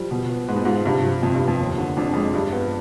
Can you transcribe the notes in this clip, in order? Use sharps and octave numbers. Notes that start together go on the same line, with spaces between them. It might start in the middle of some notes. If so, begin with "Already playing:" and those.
Already playing: F3 G3
B2
B3
G#2 B4
B2
G#2 F4
G2 C3
F3
F2 C3
G2
B3
F2
D#2
D3
F2 D4
F2 G#3
G2 F3
B3